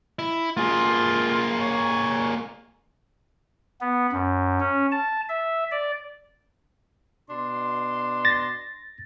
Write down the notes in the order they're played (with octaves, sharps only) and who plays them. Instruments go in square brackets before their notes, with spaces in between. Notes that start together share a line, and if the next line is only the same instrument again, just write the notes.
[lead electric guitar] E4
[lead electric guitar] A#3 G#4 [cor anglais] F4
[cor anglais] C#5
[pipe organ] B3
F#2
C#4
A5
E5
D5
[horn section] B2 D4 C6
[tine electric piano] A6 A#6